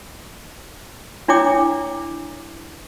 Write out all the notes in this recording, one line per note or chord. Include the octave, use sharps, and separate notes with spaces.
D4 E4 C#5 G5 D6 D#6